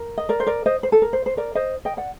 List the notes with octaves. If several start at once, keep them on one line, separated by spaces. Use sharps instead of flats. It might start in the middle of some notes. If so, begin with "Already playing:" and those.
Already playing: A#4
D#5
A#4 D5
C5
A#4 D5
C5 D#5
C5
A4
A#4
C5
C5
A#4 D5
C5 D#5
D#5 G5
D5 F#5